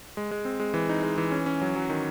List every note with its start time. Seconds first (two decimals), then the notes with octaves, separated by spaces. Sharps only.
0.17 G#3
0.31 G#3
0.45 C4
0.60 G#3
0.74 E3
0.89 D#4
1.03 G#3
1.18 E3
1.32 C#4
1.46 C#4
1.62 F#3
1.76 F#3
1.90 D#3